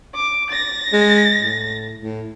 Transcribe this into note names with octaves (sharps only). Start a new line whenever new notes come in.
D6
A6 A#6
G#3
A2
A2